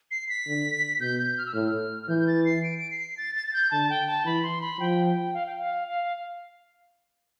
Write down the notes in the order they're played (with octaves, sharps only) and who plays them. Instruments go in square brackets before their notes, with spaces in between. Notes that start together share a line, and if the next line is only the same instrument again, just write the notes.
[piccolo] C7
B6
[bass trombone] D3
[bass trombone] B2 [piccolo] G6
[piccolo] G6
F6
E6
[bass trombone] A2 [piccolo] F6
[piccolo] F6
[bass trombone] E3 [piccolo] G6
[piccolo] G6
A6
C7
D7
D7
C7
A6
A6
A6
G6
[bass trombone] D3 [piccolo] A5
[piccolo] G5
A5
[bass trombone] E3 [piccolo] B5
[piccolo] C6
B5
[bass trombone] F3 [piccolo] G5
[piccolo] G5
F5
G5
F5
F5